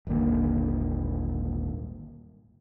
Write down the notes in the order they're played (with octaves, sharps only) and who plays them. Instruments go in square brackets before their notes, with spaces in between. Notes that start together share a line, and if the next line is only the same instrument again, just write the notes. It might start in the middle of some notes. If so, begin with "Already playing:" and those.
[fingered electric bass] D#1 G#1 D3 A#3